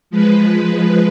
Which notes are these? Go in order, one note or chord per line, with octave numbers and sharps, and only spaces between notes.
F3 G#3 B4